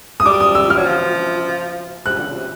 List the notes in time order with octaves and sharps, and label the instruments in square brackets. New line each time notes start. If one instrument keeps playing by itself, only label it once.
[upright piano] D#6
[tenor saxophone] G3 [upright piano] D6
[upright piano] D#6
E6
F6
[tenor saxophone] F#3
F3
[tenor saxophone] C3 [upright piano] F#6
[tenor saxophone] D3
C#3
C3